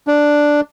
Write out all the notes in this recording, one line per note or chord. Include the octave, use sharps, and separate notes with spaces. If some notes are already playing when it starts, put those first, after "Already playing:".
D4